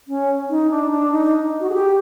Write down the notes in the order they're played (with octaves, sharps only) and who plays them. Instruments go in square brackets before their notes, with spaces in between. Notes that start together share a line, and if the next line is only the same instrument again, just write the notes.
[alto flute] C#4
D#4
D4
D4
D#4
F#4
G#4
G4